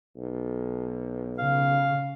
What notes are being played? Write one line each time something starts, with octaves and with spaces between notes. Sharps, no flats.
B1
C#3 F5